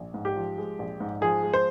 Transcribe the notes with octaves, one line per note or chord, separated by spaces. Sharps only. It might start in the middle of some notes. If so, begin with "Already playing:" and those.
Already playing: A#1
G#2
G4
F3
G#3
A#1
G#2
F3 G#4
G#3
C5